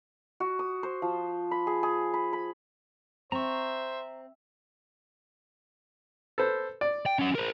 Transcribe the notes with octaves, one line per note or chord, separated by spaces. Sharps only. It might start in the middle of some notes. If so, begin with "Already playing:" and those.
F#4
D#6
C5
F3
B5
G#4
G#4
B5
B5
C4 C5 E5 A#5 C#6
A4 B4 C5
D5
G5
C#4 F#5
A#4 C5